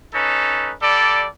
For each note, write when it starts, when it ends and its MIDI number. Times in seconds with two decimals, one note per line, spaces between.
0.14 0.72 61
0.14 0.72 63
0.14 0.72 69
0.14 0.72 71
0.81 1.26 55
0.81 1.26 69
0.81 1.26 74